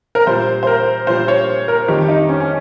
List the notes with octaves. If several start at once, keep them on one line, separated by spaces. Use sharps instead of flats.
A#4
A#2 G3 C5
C5
A#4
A#2 G3 C5
C#5
A#4
F2 D#3 G3 G4
D#4
C#4
C#4